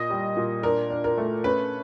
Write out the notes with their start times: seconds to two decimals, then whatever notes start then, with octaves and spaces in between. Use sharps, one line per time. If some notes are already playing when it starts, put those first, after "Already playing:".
Already playing: A#2 D#5
0.10 G3
0.37 A#2
0.63 D4 A#4
0.90 D4
1.04 A#4
1.18 A3
1.44 C#4 B4